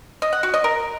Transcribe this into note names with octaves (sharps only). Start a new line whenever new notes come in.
D#5
F#5
F#4
D#5
A#4